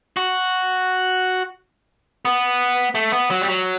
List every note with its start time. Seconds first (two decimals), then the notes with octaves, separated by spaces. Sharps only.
0.17 F#4
2.25 B3
2.95 A3
3.12 B3
3.30 F#3
3.41 G3
3.48 F#3